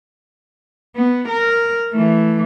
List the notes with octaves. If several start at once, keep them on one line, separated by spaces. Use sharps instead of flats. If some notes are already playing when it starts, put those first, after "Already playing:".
B3
A#4
E3 A3